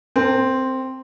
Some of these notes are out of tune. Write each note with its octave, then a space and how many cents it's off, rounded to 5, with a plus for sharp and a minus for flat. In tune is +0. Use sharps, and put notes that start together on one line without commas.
C4 +0 A#4 -45